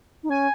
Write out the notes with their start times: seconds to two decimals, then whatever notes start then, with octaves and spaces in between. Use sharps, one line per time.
0.23 D#4
0.30 C#4 G#5